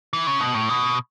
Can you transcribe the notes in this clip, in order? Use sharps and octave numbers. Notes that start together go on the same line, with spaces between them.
E3
C#3
B2
A2
B2